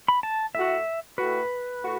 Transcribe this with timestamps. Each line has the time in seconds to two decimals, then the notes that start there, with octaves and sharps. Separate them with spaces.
0.08 B5
0.23 A5
0.55 A2 A3 F#4 E5
1.18 A2 A3 F#4 B4
1.81 A2 A3 F#4